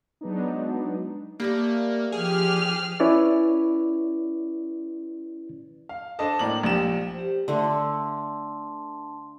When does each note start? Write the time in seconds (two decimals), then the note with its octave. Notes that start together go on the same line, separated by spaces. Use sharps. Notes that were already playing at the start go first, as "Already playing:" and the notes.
0.21 F#3 G#3 B3 D4 D#4
1.40 G3 A3 A#3 D5
2.12 F3 G4 G#4 F6
3.00 C#4 E4 B4 C#5 D5
5.89 F5
6.19 D4 A4 C5 D5 D#5 A5
6.39 A2 A#3 D5 A#5 F#7
6.63 A#1 G4 E7
7.14 G4 C5
7.48 D3 A3 D4 A5 C6